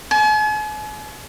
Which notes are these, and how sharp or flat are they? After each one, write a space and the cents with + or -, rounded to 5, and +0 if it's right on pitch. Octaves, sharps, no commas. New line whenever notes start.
G#5 +45